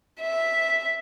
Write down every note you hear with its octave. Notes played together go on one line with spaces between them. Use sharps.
E5